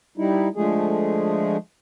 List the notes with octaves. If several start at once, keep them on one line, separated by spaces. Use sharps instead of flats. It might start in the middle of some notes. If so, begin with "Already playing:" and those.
G3 D#4 E4
D3 F3 G#3 A3 G#4